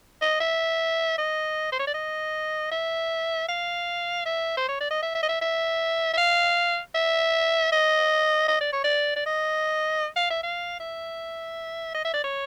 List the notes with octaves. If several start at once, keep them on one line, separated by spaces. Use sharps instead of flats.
D#5
E5
D#5
C5
C#5
D5
D#5
E5
F5
E5
C5
C#5
D5
D#5
E5
E5
D#5
E5
E5
E5
F5
E5
D#5
D#5
D5
C#5
D5
D5
D#5
F5
E5
F5
E5
D#5
E5
D5
C#5